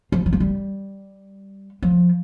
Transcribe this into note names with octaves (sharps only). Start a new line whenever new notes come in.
F3
E3
F3
G3
F3